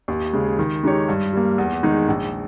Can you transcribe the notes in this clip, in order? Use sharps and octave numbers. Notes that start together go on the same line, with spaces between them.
D#2
C#3 G#3
D#3
G#3 D#4 G4 C#5
G2
G3 A#3
E2
D#3 G#3 D#4
A#1